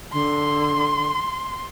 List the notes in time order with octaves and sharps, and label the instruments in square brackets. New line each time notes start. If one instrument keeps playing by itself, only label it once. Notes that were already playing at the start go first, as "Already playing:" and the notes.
[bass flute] D3 [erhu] C6